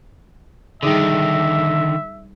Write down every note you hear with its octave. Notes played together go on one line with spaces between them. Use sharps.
D3 D#3 G3 D#4 G#4 E5